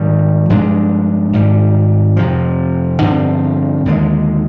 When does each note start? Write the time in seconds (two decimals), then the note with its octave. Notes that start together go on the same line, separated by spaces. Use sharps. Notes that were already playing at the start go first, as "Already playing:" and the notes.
Already playing: G#2 D#3 G3
0.49 G2 F3 G#3 D4
1.33 G#1 G#2 G3
2.16 F2 C3 F3
3.01 G2 D3 F3 C4
3.85 D#2 D3 F3 G#3